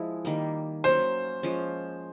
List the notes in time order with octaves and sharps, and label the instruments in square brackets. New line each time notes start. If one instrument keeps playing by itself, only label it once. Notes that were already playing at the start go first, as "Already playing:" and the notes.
Already playing: [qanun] F3 G#3 E4
D#3 G3 A#3
[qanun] F#3 A#3 C#4 [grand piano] C5
[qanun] F3 G#3 C#4